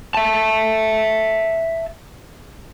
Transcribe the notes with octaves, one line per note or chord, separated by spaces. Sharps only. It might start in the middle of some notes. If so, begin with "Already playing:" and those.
E5 A5